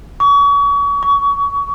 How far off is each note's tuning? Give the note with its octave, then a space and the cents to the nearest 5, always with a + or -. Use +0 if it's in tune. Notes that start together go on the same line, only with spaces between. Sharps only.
C#6 +35
C#6 +25